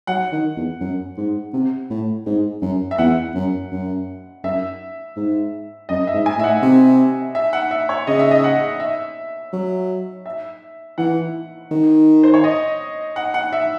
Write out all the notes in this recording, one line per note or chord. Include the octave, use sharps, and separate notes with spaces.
F#3 F#5
D#3
E2
F#2
G#2
C3
A2
G#2
F#2
E5
E2 F#5
F#2
F#2
F#2 E5
G#2
F#2 D#5
E5
G#2
G#5
A2 E5
F#5
C3
E5
F#5
E5
C#5
C#3 D#5
E5
D#5
F#5
E5
F#3
E5
E3 F#5
D#3
C5
C#5
D#5
F#5
F#5
E5